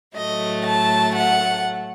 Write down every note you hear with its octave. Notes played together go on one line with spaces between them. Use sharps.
A2 F#3 A3 D#5
A5
F#5